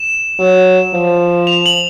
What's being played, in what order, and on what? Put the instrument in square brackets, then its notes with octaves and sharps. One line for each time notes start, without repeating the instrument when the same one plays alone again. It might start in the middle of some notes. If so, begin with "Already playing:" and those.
Already playing: [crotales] E7
[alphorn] F#3
F3
[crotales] F7
F#7